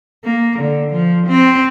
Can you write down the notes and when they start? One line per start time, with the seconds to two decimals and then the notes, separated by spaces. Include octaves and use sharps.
0.24 A#3
0.59 D3
0.91 F3
1.27 C4